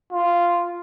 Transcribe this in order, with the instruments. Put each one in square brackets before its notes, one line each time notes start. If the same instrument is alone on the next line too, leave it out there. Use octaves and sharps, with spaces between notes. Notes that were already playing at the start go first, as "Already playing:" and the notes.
[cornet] F4